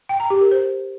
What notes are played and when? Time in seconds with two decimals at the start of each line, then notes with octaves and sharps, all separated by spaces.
0.09 G5
0.20 A#5
0.30 G4
0.41 A#4
0.51 C5